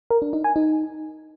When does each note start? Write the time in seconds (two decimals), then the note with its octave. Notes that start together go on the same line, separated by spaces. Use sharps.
0.10 A#4
0.22 D4
0.33 D#4
0.44 G#5
0.56 D#4